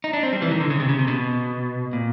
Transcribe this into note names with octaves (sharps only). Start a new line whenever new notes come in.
D#4
D4
C4
G3
E3
D#3
D3
C#3
C3
C#3
C3
B2
A#2